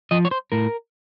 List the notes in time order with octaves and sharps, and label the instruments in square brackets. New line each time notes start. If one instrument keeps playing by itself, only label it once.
[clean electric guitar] F3 D#5
C#5
C5
A2 A#4